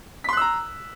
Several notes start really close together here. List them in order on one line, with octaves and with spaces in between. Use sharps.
B6 C6 F#6 E6 A#5